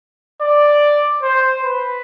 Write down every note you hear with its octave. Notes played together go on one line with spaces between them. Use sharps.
D5
C5
B4